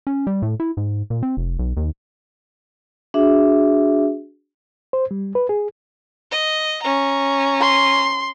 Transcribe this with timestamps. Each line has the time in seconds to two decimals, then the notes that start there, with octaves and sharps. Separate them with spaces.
0.07 C#4
0.27 G3
0.42 A2
0.60 E4
0.77 G#2
1.10 A#2
1.23 C4
1.37 F1
1.59 B1
1.77 D#2
3.14 D4 F#4 G#4 E5
4.93 C5
5.11 G3
5.35 B4
5.49 G#4
6.31 D#5
6.82 C#4 A#5
7.60 C6